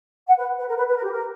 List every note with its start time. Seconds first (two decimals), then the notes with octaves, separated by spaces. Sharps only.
0.27 F#5
0.38 B4
0.58 B4
0.68 A#4
0.77 B4
0.88 B4
0.96 A#4
1.04 G4
1.11 A#4